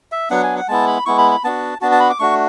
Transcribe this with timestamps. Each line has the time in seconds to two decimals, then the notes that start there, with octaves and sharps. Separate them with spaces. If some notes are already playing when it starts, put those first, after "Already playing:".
0.12 E5
0.30 F#3 B3 D4 F#5
0.43 G#5
0.56 F#5
0.68 G#3 B3 E4 A5
0.87 B5
1.06 G#3 B3 E4 C#6
1.18 B5
1.31 B5
1.44 B3 D4 F#4 A5
1.81 B3 D4 F#4 A5
1.92 A5
2.00 B5
2.10 D6
2.19 A3 D4 F#4 C#6